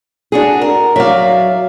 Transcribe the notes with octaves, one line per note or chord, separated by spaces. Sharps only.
D4 F#4 G#4
A#4
F#3 D5 E5 F5